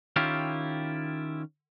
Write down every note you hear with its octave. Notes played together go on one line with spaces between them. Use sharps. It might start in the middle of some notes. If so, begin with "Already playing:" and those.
D#3 C#4 E4 F4 G4